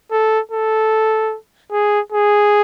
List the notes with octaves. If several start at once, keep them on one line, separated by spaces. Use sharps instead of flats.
A4
A4
G#4
G#4